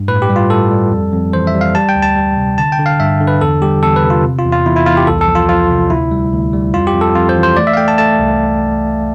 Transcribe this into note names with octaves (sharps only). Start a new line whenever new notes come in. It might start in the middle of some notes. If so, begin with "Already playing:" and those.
Already playing: G2
A2 B4
G4
G3
F4
A2 A4
G3
F2
F2
E3 C5
E5
G3
F5
G3 A5
G5
D2
A5
G3
C3
D3 A5
G5
D3
F5
G2 E5
D3
B4
E2 A4
G3 G4
E2 A4
B4
C3
F4
C3
F4
E2
F4
E2 E4
E4
E2 F4
G4
C2 A4
A4
F3
F4
F3 F4
C3
D2 E4
G3
D2
G3
F2 F4
G4
F2
A4
F2 F4
C5
E3
C5
A3 D5
E5
F5
A3 G5
A5
A3 A5
C2